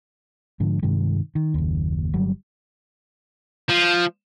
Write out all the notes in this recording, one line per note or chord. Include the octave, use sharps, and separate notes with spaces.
G#2 D3 F3
G2 C3 D#3 G#3
D#3
F#1 D#2
G1 F#3 G3
F3